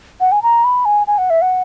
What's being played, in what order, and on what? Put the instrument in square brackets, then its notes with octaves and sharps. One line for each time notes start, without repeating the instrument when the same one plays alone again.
[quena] F#5
G#5
A#5
B5
G#5
G#5
F#5
E5
F#5